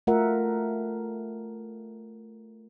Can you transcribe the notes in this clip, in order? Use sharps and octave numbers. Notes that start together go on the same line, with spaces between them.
A3 F4 A#4 E5 F#5